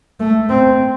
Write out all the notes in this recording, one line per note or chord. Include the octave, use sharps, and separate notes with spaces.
A3
C4